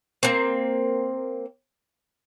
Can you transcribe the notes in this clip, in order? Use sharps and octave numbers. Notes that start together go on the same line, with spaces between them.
A#3 C4